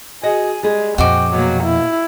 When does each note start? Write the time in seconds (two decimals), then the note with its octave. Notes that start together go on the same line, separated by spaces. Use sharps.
0.23 F#4 G#4 D#5
0.63 G3 G#3 G#4
0.98 F2 A#2 C4 F#4 D#5 G5 D6
1.33 B2 F#3 A#3
1.63 E4